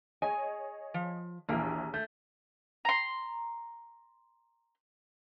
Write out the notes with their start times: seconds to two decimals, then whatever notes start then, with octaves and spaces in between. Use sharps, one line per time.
0.22 G#4 C#5 D#5 G#5
0.94 F3
1.49 A#1 D#2 E3 A#3
1.94 A3 G6
2.85 A#5 C6